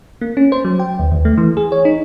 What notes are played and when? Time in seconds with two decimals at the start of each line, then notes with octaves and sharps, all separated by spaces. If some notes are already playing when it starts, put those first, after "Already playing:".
0.21 A#3
0.37 C#4
0.52 C5
0.65 F#3
0.79 G5
0.99 D#2
1.12 D#2
1.25 A3
1.38 E3
1.57 G#4
1.72 C#5
1.85 D#4